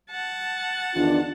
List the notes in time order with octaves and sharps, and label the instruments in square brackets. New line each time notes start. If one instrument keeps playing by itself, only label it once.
[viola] F#5 A5
[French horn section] E2 D#3 F4 [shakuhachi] D4